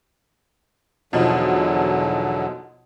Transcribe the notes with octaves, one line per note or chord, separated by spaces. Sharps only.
E2 B2 D3 F3 F#3 D#4